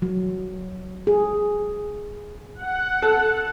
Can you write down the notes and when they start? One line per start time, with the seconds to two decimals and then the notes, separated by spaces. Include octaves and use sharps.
0.02 F#3
1.07 G#4
2.61 F#5
3.02 A4